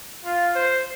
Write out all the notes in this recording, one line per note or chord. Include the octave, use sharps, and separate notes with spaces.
F4
C5